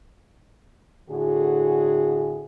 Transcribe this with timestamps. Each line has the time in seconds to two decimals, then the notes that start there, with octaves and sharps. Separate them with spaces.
1.09 A2 D3 F#4 G#4